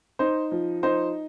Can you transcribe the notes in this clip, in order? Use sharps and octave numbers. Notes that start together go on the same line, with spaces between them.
D#4 C5
F3
D#4 C5